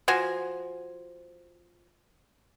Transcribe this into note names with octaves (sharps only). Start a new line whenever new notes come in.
F3 F#4 G#5